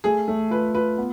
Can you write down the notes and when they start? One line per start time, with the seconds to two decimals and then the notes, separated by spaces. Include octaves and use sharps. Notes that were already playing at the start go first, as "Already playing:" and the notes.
0.04 A3 G#4
0.28 A3
0.51 F4 B4
0.75 F4 B4
0.98 B3